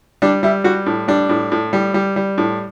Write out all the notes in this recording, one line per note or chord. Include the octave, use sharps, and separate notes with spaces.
G3 D4
G3 E4
G3 F#4
A2
G3 D4
A2
A2
G3
G3
G3
A2